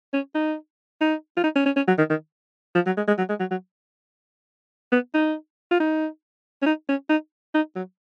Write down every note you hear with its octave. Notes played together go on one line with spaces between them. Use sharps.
C#4
D#4
D#4
F4
D#4
C#4
C#4
C#4
F#3
D#3
D#3
F3
F#3
G#3
G#3
F#3
G#3
F#3
F#3
B3
D#4
F4
D#4
C#4
D#4
C#4
D#4
D#4
F#3